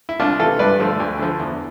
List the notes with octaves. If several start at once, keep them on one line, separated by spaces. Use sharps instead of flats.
E4
C2 D4 F4
C3 E3 F4 A4
G2 B4 D5
D3 F3 A3
D2
D3 F3
E2